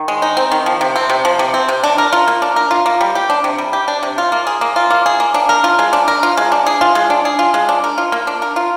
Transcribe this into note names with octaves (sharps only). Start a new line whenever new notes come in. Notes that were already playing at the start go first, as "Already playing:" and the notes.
Already playing: D#3
G#3
D#4
C4
D#3
F3
C3
C4
C3
F3
C3
C4
C3
D4
A#4
F4
A#3
D4
A#4
F4
A#3
G3
G4
D4
C3
G3
G4
D4
C3
F4
A#3
G#4
A#3
F4
A#3
G#4
A#3
D4
A#4
F4
G#3
D4
A#4
F4
G#3
D4
G#4
F4
G#3
D4
G#4
F4
G#3
D4
A#4
F4
A#3
D4
A#4
F4